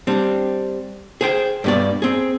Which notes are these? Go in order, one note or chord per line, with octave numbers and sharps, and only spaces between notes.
G3 C4 D4
G#4 C5 G5
G2 B2 D5
C4 G#4